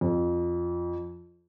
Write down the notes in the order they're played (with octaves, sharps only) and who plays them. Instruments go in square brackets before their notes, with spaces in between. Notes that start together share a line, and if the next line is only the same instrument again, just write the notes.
[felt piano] F2